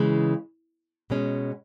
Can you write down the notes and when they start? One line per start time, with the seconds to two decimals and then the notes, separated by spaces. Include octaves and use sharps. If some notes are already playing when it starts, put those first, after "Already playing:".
Already playing: C#3 E3 G#3
1.10 B2 G#3 C#4